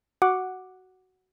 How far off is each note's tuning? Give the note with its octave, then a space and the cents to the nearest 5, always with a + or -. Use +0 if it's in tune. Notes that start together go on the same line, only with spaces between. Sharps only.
F#4 +10 F#5 +0 D6 +5